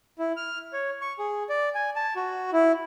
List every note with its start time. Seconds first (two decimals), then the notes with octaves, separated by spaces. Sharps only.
0.19 E4
0.37 F6
0.73 C#5
1.01 C#6
1.19 G#4
1.49 D5
1.75 G#5
1.96 A5
2.16 F#4
2.53 E4